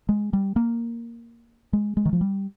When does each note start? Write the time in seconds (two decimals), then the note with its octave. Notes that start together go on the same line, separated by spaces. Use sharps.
0.09 G#3
0.33 G3
0.56 A#3
1.73 G#3
1.97 G#3
2.05 D#3
2.13 F3
2.21 G3